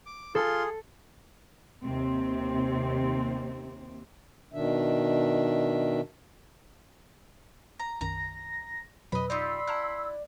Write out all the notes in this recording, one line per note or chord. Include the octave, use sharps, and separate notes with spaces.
D6
F4 G#4 A4 C6
D#2 C3 C4
B2 D#3 D4 E5
A#5
B1 F#2 D#3 A#5 A#6
F2 B2 F#3 B4 D#5 B5
D#4 F4 G4 D5 B5 C6 E6
E4 F#5 A5 A#5 F6